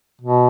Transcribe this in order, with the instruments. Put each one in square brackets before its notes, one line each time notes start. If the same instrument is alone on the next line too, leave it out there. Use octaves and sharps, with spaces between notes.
[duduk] B2